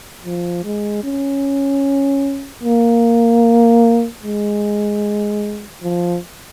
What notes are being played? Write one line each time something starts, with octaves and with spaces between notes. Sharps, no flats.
F3
G#3
C#4
A#3
G#3
F3